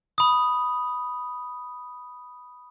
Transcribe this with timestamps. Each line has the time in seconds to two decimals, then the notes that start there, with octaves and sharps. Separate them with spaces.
0.18 B5 D#6